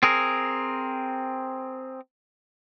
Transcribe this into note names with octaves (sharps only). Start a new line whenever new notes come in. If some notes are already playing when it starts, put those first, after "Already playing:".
C4 G#4 A#4